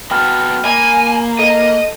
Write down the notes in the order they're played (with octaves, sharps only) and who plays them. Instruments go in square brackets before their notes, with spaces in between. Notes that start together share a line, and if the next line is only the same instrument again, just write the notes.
[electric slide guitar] B3 F#4 A4 [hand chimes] G5 B5 F6
[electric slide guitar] A#3 [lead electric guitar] G#5 [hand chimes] B5
[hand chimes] A4 [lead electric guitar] D#5